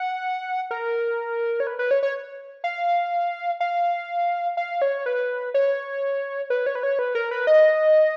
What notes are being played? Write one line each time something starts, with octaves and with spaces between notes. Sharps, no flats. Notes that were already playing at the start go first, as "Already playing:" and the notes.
Already playing: F#5
A#4
C#5
B4
B4
C#5
C#5
F5
F5
F5
C#5
B4
C#5
B4
C#5
B4
C#5
B4
A#4
B4
D#5